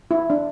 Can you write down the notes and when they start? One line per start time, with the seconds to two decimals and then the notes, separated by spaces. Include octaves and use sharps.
0.11 E4
0.30 D4